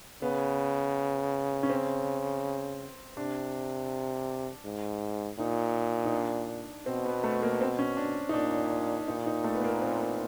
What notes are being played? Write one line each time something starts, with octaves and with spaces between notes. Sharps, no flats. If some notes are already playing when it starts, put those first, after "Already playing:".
C#3 B3
C#4
C4
C3 D4
G#2
A#2 D#4
D#4
D4
B2 C4
B3
A3
A#3
C4
C#4
D4
D#4
A#2 D4
A#2 D#4
D#4
A3
B3
A#3
C4